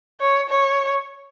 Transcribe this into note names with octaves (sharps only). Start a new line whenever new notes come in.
C#5
C#5